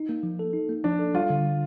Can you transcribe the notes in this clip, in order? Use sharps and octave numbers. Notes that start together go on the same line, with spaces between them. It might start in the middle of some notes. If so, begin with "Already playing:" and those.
Already playing: D#4
A#3
F3
A4
D#4
A#3
F3 D4
A4
G3 F4
D3